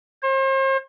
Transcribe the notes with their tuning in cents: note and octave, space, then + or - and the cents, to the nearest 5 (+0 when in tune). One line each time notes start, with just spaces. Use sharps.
C5 +40